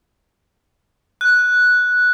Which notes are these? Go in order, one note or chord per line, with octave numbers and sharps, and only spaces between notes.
F#6